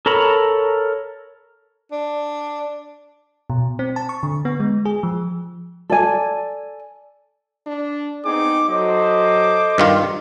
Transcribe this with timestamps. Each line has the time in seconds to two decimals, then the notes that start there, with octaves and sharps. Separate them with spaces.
0.06 A4 A#4 C#5 A#5 B5
1.92 D4
3.50 B2
3.79 C4
3.96 A5
4.09 C#6
4.23 D3
4.45 B3
4.60 G#3
4.85 G#4
5.03 F3
5.90 A4 D5 G#5
7.66 D4
8.25 B3 C4 D#4 G#4 D6
8.70 F#3 A4 C5 D#5 D6
9.78 G2 D#3 F4